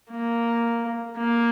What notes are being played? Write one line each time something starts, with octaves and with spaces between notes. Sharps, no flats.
A#3
A#3